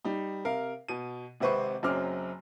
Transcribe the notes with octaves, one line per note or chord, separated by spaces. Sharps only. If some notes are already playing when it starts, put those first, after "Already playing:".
G3 D#4
C3 A#4 F5
B2 D#7
G#1 C3 C4 B4 C5 C#6
F#1 F#2 F#3 C4 D6 F6